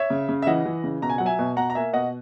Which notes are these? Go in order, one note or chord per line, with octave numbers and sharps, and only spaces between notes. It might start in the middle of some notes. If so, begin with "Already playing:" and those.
Already playing: C#5 E5
C#3
C#3
E5
E3 D#5 F#5
E3
C#3
B2 A#5
G#5
F#3 F#5
E5 G#5
B2
B2 F#5 A#5
A#5
A#3 E5 G#5
B2 D#5 F#5